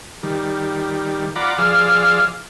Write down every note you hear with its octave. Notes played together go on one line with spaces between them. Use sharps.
D#3 G3
F4 D5 F#5 A#5 B5 D6
F3 G#4 D5 F5 E6 F6